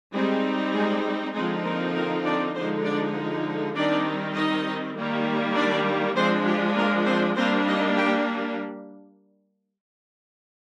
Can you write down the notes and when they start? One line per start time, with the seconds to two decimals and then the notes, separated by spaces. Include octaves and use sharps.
0.13 G3 G#3 C4 D#4 G#4
0.74 G#3 G#4
1.34 D3 F3 G#3 C4 D#4 G#4
1.64 A#3 A#4
1.94 A#3 A#4
2.24 D4 D5
2.54 D3 F3 G#3 C4 D#4 C5
2.84 D4 D5
3.75 D#3 G3 C4 D4 D#4 D5
4.35 D#4 D#5
4.95 D#3 G3 A#3
5.55 D4 D5
6.16 F3 G#3 C4 D4 C5
6.46 G4
6.76 A#3 A#4
7.06 C4 C5
7.36 G3 A#3 C4 D4 C5
7.66 D#4 D#5
7.97 G4 G5